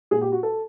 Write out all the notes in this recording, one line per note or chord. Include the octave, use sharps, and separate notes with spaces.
A#2 G#4
G4
F#4
A4